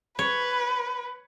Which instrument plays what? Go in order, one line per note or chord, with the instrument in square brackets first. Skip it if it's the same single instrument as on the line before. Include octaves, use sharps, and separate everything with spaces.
[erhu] B4 [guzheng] C#5